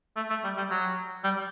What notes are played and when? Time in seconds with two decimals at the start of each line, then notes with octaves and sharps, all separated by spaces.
0.16 A3
0.30 A3
0.44 G3
0.57 G3
0.70 F#3
1.24 G3